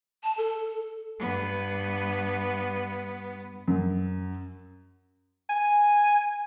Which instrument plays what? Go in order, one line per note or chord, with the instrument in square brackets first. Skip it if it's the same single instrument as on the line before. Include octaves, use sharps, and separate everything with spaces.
[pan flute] A5
A4
[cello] G2 B3
[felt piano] F#2
[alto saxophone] G#5